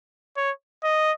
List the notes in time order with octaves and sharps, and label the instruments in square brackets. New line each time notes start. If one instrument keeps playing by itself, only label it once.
[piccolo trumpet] C#5
D#5